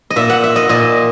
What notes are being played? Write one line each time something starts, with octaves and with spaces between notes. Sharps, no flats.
D#5
A#2 E5
F#5
E5
D#5
A#2 D#5